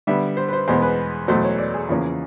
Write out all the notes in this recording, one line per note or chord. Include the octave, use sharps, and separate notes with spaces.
D3 G3 B3 E5
C5
B4
C5
E2 B2 G#3 B3 C5
B4
E2 B2 F#3 A3 C5
C#5
D5
G#4
E2 C#3 F3 A#3 C#4